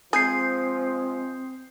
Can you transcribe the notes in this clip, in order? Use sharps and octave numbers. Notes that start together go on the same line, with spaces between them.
F3 G#3 C4 G#4 D#6 G6 C7